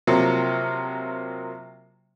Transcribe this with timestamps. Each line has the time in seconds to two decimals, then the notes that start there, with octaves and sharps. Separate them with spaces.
0.07 C3 F3 F#3 A#3